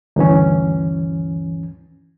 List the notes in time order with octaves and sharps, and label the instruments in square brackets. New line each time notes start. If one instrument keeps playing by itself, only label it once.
[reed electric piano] D2 G2 E3 C#4